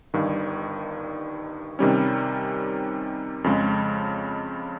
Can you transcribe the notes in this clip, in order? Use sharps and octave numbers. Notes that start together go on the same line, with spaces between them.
G1 G2 D#3
C3 D#3 G3 C#4
F2 C#3 G#3